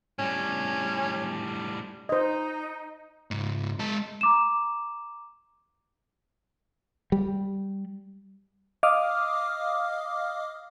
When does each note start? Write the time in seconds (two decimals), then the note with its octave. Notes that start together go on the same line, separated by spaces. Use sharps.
0.19 A2 G3 C#4
2.09 D#4 C5 D#5
3.31 C#2 G#2
3.79 G#3 A5
4.21 A#5 D6 E7
7.12 G3
8.83 D#5 F5 D6 D#6 F6